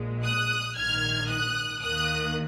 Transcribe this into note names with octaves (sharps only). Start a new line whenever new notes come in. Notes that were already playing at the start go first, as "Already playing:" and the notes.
Already playing: A#1 A#2 G#3
D#6 F#6
A#1 G#2 D#3 F6 G#6
D#6 F#6
D#2 D#3 A#3 D#6 F#6